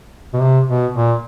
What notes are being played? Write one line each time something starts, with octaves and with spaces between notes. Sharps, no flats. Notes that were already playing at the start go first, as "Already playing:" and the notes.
B2
C3
B2
A#2